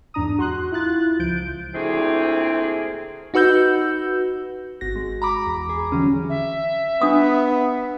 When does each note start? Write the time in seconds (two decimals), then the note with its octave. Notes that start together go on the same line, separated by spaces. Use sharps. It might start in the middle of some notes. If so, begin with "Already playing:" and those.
0.14 E2 G#2 D4 A#5 D#6
0.39 F#4 C6 F#6
0.72 E4 F4 F#6 A6
1.19 C#2 F3 G6 D7
1.74 D2 A#2 C4 E4 G#4
3.34 D#4 F#4 B4 E6 G6
4.81 G#1 F#4 A#6
4.96 G#3
5.22 A#5 B5 D6
5.46 E2
5.69 G#4
5.92 D3 E3 F#3 G3 C#4
6.30 E5
7.01 B3 D4 D#6